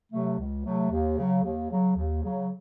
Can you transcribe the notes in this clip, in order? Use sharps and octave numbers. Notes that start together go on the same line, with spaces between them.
C3 F#3 A3
C#2
C3 F#3 A3
D#2
C#3 F#3
D#2
C#3 F#3
D#2
C#3 F#3